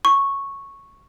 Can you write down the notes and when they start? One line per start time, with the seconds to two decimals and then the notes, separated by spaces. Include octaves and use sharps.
0.05 C#6